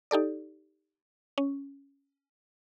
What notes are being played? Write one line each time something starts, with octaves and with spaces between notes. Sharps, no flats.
D#4 G4 A4 D5
C#4